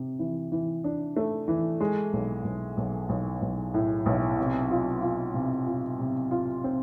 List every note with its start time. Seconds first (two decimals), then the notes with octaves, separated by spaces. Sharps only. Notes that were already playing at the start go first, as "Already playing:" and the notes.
Already playing: C3
0.19 E3
0.52 E3
0.84 D4
1.16 A3
1.48 E3
1.80 G#3
2.13 B1
2.44 B1
2.77 B1
3.09 B1
3.42 B1
3.74 A2
4.06 B1
4.38 C3
4.71 F4
5.02 F4
5.34 C3
5.66 F4
5.99 C3
6.31 F4
6.64 C4